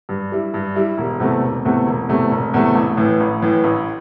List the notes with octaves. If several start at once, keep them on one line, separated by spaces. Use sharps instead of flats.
G2
G3 E4
G2
G3 E4
E1
E2 C3 A3
E1
E2 C3 A3
E1
E2 C3 A3
E1
E2 C3 A3
A1
A2 E3
A1
A2 E3
A1